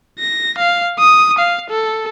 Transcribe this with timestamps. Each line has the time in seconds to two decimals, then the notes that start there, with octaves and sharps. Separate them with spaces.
0.19 A#6
0.58 F5
0.99 D#6
1.38 F5
1.70 A4